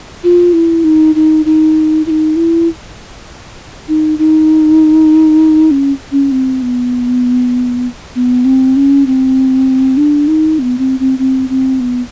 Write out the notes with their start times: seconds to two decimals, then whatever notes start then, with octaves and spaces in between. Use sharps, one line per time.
0.24 F4
0.53 E4
0.84 D#4
1.15 D#4
1.45 D#4
2.06 E4
2.10 D#4
2.36 E4
3.88 D#4
4.18 D#4
5.71 C#4
6.12 C#4
6.32 C4
6.62 B3
8.15 B3
8.45 C4
8.76 C#4
9.06 C4
9.97 D4
10.28 D#4
10.59 C4
10.62 B3
10.78 C4
10.99 C4
11.19 C4
11.49 C4
11.80 B3